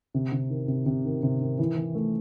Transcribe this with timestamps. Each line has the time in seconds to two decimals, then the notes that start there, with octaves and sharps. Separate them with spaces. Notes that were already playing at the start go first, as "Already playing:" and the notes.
0.14 C3
0.32 C3
0.50 D#3
0.68 C3
0.86 C3
1.04 D#3
1.23 C3
1.41 D#3
1.59 E3
1.77 E3
1.95 A3